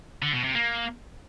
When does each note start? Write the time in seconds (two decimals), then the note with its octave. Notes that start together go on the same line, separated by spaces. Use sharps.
0.22 D3
0.33 B2
0.44 C3
0.55 A#3